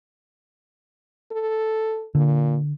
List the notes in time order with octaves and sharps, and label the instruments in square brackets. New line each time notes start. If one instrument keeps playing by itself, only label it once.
[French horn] A4
[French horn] A#2 [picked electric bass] D3